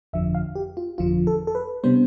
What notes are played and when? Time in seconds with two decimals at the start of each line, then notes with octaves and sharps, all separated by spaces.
0.13 G1 F2 D3 F3 E5
0.35 F5
0.55 G4
0.77 F4
0.98 G1 F2 D3 F3 F4
1.27 A4
1.47 A4
1.55 B4
1.83 C3 G3 B3 D4 C5